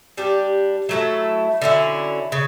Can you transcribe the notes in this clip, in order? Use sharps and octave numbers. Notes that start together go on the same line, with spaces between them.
G3 D4 G4
F#3 A3 E4 A4
D3 F#3 C#4 E4
C#3